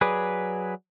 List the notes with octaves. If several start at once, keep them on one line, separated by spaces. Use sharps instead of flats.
F#3 G#4 B4 D5